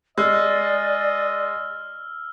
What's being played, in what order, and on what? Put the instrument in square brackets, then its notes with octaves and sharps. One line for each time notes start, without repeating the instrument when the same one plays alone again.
[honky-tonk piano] G#3 [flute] D5 [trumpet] D#5 [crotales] E6 F6